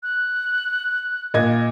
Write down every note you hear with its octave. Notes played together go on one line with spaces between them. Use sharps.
F#6
A#2 D#5 G#6